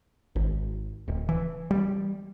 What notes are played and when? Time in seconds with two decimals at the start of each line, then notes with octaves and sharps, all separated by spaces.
0.36 G#1
1.08 D1
1.29 E3
1.71 G3